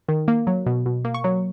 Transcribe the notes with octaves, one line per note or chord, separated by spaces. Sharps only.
D#3
A#3
F#3
B2
B2
A#3
C#6
F#3